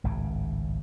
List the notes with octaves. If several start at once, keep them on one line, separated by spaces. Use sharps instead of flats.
G#1 C#2 A2 C#3